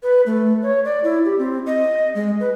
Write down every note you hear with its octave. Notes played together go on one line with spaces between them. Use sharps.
B4
A3
C#5
D5
E4
G4
C4
D#5
G#3
B4